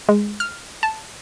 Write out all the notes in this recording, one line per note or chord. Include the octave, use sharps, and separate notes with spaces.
G#3
F6
A5